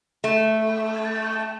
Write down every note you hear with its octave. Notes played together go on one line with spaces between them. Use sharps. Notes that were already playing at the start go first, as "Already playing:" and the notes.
A3